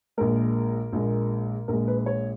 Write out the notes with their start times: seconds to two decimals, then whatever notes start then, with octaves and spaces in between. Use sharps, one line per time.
0.17 A#1 A#2 G#3 A#4
0.93 A#1 A#2 G#3
1.68 A#1 A#2 G#3 A#4
1.88 B4
1.98 B4
2.06 C#5